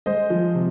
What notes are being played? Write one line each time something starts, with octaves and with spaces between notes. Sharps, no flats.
G#3 C5 D#5
F3
C3